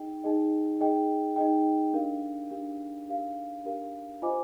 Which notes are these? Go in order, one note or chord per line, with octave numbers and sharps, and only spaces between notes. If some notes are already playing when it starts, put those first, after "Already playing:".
Already playing: D#4 G#4 D#5 G5
D#4 G#4 D#5 G5
D#4 G#4 D#5 G5
D#4 G#4 D#5 G5
D4 G4 A#4 F5
D4 G4 A#4 F5
D4 G4 A#4 F5
D4 G4 A#4 F5
F4 C5 D#5 G#5 D6